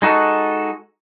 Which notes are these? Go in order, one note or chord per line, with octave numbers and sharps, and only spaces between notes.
G#3 D#4 F#4 A4